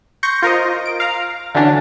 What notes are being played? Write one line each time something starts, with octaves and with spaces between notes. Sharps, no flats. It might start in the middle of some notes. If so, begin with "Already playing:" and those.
C6 C#6 G6 A#6 C#7
F4 A#4 C5 D#5
D7
F5 A#5
D3 E3 F#3 C#4 D4